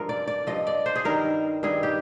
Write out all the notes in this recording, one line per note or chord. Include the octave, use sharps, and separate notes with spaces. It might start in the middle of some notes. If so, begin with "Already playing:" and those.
Already playing: G2 F3 A#4
D5
D5
G2 F3 D#5
D5
C5
G#4
G2 D#3 G3 A#4
G2 D#3 G3 G#4
G4